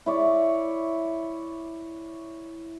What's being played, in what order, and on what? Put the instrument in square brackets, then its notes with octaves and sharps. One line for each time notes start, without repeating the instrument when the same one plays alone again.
[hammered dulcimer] E4 C#5 D5